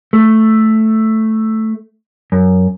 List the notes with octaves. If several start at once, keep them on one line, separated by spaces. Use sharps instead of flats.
A3
F#2